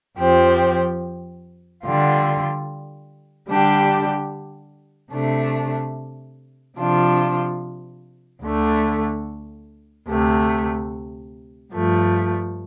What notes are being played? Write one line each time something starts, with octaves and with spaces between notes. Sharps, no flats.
F2 F3 C4 G4
D3 G3 F4
D3 G3 D4 G4
C3 A3 D4
C3 F3 D4 F4
D2 D3 A3
D2 C3 A3
G2 F3 A3